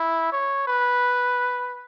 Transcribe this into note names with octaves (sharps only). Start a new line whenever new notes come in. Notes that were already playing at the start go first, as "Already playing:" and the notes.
Already playing: E4
C#5
B4